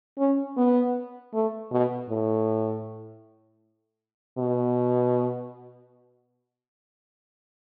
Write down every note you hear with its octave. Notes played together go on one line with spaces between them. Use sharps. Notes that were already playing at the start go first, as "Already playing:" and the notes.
C#4
B3
A3
B2
A2
B2